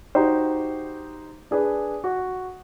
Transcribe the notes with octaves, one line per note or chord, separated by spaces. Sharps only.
D#4 F#4 G4 C5
D4 G#4 B4
F#4